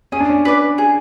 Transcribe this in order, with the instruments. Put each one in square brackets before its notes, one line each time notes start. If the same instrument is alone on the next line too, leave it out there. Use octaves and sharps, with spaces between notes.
[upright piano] C#4 [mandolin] G#4
[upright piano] D4
C#4
[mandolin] B4 D5
G#4